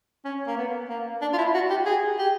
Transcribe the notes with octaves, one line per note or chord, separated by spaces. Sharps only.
C#4
A#3
B3
A#3
D4
F4
E4
F#4
G4
G#4
G4